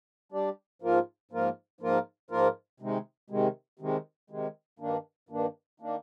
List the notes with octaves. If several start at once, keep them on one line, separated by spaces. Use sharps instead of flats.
G3 D4 G4 D5
G#2 F3 A#3 F4 A#4
G#2 F3 A#3 F4 A#4
G#2 F3 A#3 F4 A#4
G#2 F3 A#3 F4 A#4
C3 D#3 G#3
C3 D#3 G#3
C3 D#3 G#3
C3 D#3 G#3
G2 D#3 A#3 D4
G2 D#3 A#3 D4
D#3 A#3 D4